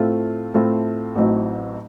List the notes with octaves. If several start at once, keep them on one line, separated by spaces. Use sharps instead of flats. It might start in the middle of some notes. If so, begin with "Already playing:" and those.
Already playing: A2 A3 C4 F4
A2 A3 C4 F4
A1 A2 F#3 C4 D#4